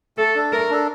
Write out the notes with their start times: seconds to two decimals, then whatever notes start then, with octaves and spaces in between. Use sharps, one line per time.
0.17 A3 A4
0.35 D4 A4
0.52 A3 A#4
0.70 D4 A4